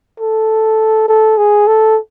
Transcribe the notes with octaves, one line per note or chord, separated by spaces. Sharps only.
A4
A4
G#4
A4